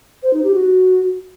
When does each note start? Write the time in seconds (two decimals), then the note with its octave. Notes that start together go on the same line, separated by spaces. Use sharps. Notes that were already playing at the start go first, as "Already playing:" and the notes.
0.23 C5
0.33 D#4
0.44 G4
0.54 F#4